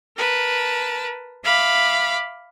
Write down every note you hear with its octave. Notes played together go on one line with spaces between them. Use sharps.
A#4 B4 A5
E5 F5 B5 D6